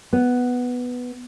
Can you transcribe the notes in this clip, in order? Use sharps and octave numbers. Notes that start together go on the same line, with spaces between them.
B3